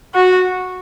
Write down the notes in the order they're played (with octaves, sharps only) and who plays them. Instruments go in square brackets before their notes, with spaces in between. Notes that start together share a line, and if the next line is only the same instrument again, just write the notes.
[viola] F#4